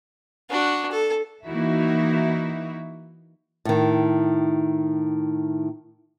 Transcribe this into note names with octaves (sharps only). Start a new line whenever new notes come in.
D4 F#4
A4
E3 A#3 D#4 E4 F#4 E5
A2 D#3